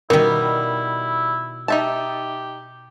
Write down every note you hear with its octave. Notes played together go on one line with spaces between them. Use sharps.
B2 D#3 G3 E4 A#4
D#4 G4 E5 A5